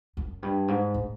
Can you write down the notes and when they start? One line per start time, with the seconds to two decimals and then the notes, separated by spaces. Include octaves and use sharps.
0.17 F#2
0.42 G2
0.68 G#2
0.94 A2